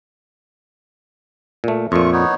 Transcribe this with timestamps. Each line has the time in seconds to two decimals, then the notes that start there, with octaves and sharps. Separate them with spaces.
1.64 A#2 A3
1.92 F2 A#2 A3 F4 C#6
2.13 B3 D#4 C#5